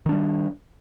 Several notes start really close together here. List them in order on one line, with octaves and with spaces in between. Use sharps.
D#3 D4 G3